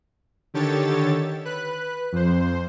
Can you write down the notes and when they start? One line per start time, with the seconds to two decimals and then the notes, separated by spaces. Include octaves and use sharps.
0.54 D3 D#3 G4 A4 C#5 A6
1.45 B4 F#6
2.12 F2 C5